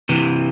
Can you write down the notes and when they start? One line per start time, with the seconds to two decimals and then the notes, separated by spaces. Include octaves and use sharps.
0.09 C3 E3